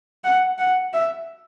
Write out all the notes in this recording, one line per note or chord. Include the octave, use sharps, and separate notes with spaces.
F#5
F#5
E5